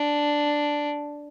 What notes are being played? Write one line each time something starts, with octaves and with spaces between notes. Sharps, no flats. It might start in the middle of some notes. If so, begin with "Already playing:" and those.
Already playing: D4